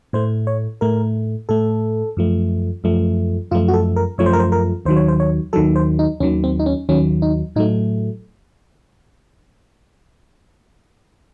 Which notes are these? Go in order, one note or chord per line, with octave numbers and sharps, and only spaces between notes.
A2 A3 C5
C#5
A2 A3 A#4
A2 A3 A4
F#2 F3 A3
F#2 F3 A3
F#2 F3 A3 F4
F#4
A4
A#4
F#2 F3 A3 C#5
C5
A#4
C5
A#4
D#2 D#3 F#3 C5
C#5
C5
C#5
D#2 D#3 F#3 A4
C5
D#4
D#2 D#3 F#3 C#4
C4
D#4
C#4
D#2 D#3 F#3 C#4
D#4
A2 F#3 A3 D#4